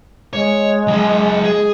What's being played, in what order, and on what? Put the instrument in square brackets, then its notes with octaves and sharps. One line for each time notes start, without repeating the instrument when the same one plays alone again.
[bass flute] G#3 [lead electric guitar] C#5
[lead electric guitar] F#3 G#4
G#4